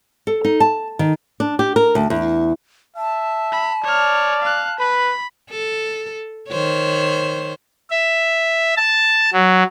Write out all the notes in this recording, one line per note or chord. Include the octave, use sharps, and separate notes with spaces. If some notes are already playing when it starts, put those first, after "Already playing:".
A4
D#4
A5
D#3
D4
G4
A#4
D2
E2
E5 A5
B5
C#5 D5 F6
F5 F#6
B4 B5
A4
D#3 C5 C#5
E5
A5
F#3